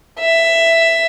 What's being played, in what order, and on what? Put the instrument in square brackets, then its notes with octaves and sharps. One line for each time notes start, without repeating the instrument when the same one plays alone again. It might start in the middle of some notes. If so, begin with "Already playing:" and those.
[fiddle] E5